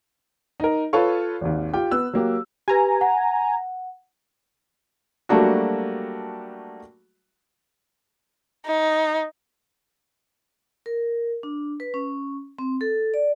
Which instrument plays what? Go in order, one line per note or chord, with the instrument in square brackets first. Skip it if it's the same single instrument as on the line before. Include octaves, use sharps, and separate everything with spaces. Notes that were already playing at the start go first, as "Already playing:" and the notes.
[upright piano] D#4 A#4
F4 A4 B4 C#5 F5 C#6
G#1 D#2
F4 G4 G5
B3 E6 F#6
F#3 A#3 G4
[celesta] G4 B4 [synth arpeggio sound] G#5 A#5
[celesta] F#5
[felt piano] F#3 G3 A3 A#3 D4 F#4
[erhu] D#4
[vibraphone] A#4
D4
B4
C#4
C4
A4
D5